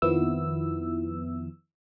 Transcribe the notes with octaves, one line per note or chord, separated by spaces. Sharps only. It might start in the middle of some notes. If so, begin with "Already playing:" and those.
F2 D#3 F3 B3 E4 E6